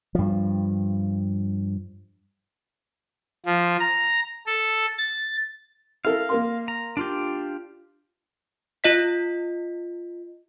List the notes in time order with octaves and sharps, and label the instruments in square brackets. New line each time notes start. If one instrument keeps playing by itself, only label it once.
[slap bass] G2 F3
[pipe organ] F3
A#5
A4
A6
[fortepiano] E4 A4 A#4 [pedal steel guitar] F5
[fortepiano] A#3 A#4 C6
[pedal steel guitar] A#5
D4 F4 G4
[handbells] F4 D#5 B6